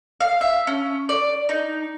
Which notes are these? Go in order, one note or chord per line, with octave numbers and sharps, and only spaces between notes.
F5
E5
C#4
D5
D#4